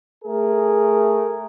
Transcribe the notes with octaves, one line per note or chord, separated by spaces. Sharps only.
A3 G#4 A#4